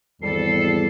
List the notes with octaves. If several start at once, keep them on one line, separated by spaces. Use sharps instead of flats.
G#1 E2 G3 A4 C7